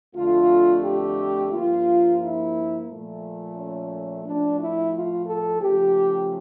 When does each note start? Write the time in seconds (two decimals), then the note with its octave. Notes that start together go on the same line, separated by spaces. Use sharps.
0.13 F2 D3 A3 F4
0.82 G4
1.50 G2 F3 A#3 F4
2.18 E4
2.87 A#2 F3 A3
3.55 C#4
4.23 A2 F3 A3 D4
4.57 E4
4.92 F4
5.25 A4
5.60 C#3 F3 A3 G4